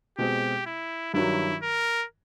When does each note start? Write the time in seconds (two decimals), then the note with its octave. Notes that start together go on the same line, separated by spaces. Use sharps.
0.18 B2 G#3 C4 G4
0.66 E4
1.14 G2 D#3 F#3 E4
1.62 A#4